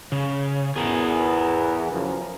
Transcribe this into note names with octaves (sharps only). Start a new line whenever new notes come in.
C#3
E2 B3 G#4 A#4
F#2 C#3 F3